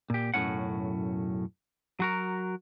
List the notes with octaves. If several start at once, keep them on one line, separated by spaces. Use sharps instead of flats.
A#2 G4
B1 F#2 A2 C#4 F#5
F#3 F#4 A#4